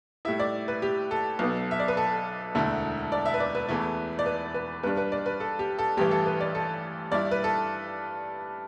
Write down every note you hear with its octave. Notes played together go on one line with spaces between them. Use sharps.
A2 G3 E4 E5
D5
B4
G4
A4
B1 B2 B3
E5
D5
B4
A4
E1 D2 D3 A3 E4
D5
E5
B4
D5
B4
E2 E3 A3 E4
D5
B4
B4
G2 G3 D4 B4
B4
D5
B4
A4
G4
A4
A1 G2 E3 G4
A4
B4
D5
A4
G2 G3 E4 D5
B4
A4